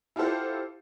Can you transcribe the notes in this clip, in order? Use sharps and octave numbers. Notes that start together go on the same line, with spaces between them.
E4 F4 G4 A4 C5 F#5